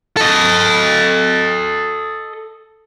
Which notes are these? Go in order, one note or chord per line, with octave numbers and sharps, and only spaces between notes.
A4 D#5